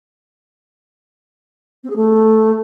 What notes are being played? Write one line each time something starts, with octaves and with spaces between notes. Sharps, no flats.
C4
G#4
A3